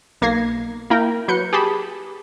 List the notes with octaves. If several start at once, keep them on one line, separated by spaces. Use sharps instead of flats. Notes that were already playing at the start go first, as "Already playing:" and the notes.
B1 A#3 G#6 A#6 C7
A#3 E4 A#4 G5 A#5
F#3 B4 G6 C#7
G4 G#4 A5 B5